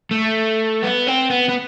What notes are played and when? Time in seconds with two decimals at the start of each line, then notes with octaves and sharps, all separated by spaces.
0.11 A3
0.83 B3
1.07 C4
1.30 B3
1.49 B3